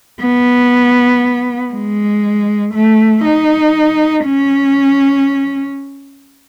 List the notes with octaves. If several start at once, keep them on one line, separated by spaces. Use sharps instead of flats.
B3
G#3
A3
D#4
C#4